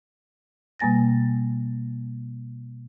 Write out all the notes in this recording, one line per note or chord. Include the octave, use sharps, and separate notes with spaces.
B2 G3 A#3 G#5 A6 A#6